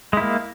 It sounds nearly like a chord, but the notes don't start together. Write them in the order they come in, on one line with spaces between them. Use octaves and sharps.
G#3 E4 A#3